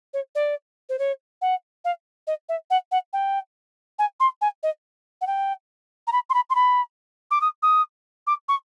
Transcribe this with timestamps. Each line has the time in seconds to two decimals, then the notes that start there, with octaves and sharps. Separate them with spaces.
0.14 C#5
0.35 D5
0.89 C5
0.99 C#5
1.42 F#5
1.85 F5
2.27 D#5
2.49 E5
2.70 F#5
2.92 F#5
3.13 G5
3.99 G#5
4.20 C6
4.41 G#5
4.63 D#5
5.21 F#5
5.27 G5
6.07 A#5
6.12 B5
6.30 C6
6.34 B5
6.50 C6
6.55 B5
7.31 D6
7.41 D#6
7.63 D#6
8.27 D6
8.49 C#6